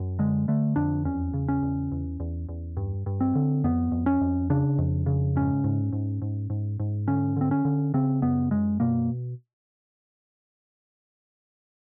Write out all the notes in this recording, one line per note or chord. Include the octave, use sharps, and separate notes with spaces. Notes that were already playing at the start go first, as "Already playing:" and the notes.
Already playing: F#2
D3 G#3
D3 A3
F2 D4
E2 C#4
C#3
C#4
E2
E2
E2
E2
G2
G2
C4
D3
F2 B3
F2
C#4
F2
C#3 D4
F2
C#3
G#2 C#4
G#2
G#2
G#2
G#2
G#2
D3 C#4
D3 C4
C#4
D3
C#3 C4
F#2 B3
F#2 G#3
B2 A#3